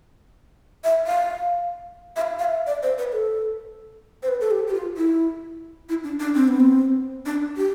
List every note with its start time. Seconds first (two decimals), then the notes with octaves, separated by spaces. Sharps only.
0.84 E5
1.07 F5
2.16 E5
2.22 F5
2.39 F5
2.45 E5
2.67 D5
2.83 C5
2.98 B4
3.12 A4
4.23 C5
4.28 B4
4.40 A4
4.51 G4
4.68 G4
4.74 F4
4.97 E4
5.89 E4
6.04 D4
6.20 D4
6.35 C4
6.48 B3
6.60 C4
7.26 D4
7.57 G4